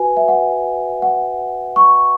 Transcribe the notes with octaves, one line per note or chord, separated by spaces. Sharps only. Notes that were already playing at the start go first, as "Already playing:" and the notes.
Already playing: F#4 B4 G#5
E5
F#5
F#5
C#6